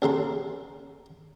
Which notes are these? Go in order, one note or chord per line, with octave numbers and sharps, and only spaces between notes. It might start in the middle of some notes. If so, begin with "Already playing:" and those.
A1 C#3 A#5 C6